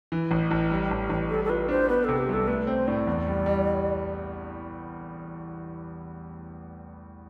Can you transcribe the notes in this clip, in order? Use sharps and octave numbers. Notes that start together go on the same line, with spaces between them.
E3
A1
A1
G3
A1
A1
G3 A4
A4
F4 B4
D4 C5
B3 B4
C3 A4
G4
C2 A4
A3 B4
C4 C5
A2 D5
E2
G3
G3